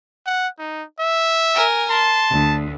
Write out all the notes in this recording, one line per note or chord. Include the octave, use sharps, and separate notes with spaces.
F#5
D#4
E5
A#4 G#5
A5 C6
D2